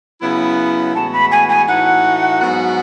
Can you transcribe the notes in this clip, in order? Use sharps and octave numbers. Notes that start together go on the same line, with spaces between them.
C#3 F#3 B3 E4
A2 E3 G#3 B3 F#4 A5
B5
G#5
G#5
A2 E3 A3 D#4 F#4 F#5
G#2 F#3 B3 F#4